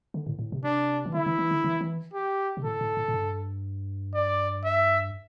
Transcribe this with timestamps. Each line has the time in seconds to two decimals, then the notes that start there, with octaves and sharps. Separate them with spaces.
0.14 D3
0.26 A2
0.39 A2
0.52 C3
0.64 D4
1.05 E3
1.14 D3 E4
1.26 E3
1.39 E3
1.51 D3
1.64 E3
1.81 E3
2.14 G4
2.57 C3
2.64 A2 A4
2.81 A2
2.97 A2
3.08 A2
3.14 G2
4.14 D5
4.64 E5